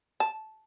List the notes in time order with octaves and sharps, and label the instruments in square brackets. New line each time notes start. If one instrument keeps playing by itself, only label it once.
[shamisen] A5